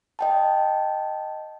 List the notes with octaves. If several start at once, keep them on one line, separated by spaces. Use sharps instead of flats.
D#5 G5 A5